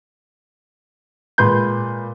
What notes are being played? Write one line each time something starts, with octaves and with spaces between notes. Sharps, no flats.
A#2 G#3 B4 C6 G6